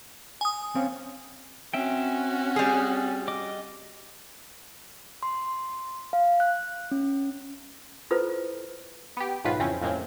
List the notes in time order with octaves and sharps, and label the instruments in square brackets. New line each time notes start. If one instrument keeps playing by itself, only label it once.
[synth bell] G#5 D#6
[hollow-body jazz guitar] C4 C#4 F5
[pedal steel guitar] C4 E5 G5 [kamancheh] C#4 F#4
[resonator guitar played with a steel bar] G3 G#4
[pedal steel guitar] D#5 D6
[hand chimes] C6
F5
F#6
C#4
[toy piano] E4 F4 A4 B4 C5
[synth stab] B3 G4
B1 G#2 D#3 F#3 F4 B4
F2 C#3 E3 C4 C#4
F2 A2 C#3 G#3 A#3 C4